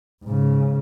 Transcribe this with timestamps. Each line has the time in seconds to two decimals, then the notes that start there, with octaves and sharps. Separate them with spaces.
0.23 G#2 C#3